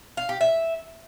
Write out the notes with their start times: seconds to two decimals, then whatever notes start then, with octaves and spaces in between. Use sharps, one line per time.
0.17 F5
0.29 G4
0.41 E5